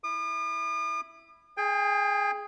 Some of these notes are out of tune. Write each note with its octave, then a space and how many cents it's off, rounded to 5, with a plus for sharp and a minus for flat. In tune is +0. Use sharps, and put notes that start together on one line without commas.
E4 +0 D#6 -45
G#4 +5 G5 +40